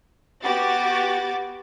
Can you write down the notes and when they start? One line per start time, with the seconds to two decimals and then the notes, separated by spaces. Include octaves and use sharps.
0.42 B3 F#4 G4 D6 A6